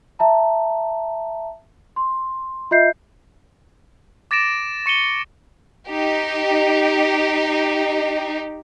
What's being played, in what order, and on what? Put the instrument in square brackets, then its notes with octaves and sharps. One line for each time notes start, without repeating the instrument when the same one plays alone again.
[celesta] E5 A5 A#5
C6
F4 D#5 E5 G6 C7
[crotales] D6 A6 A#6 D7 E7
C#6 C#7 D#7 G7
[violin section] D#4 G4